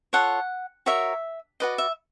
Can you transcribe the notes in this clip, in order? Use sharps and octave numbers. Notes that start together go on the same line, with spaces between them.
F4 A4 C#5 F#5
F#4 A#4 C#5 E5
F#4 B4 D5 D#5
E5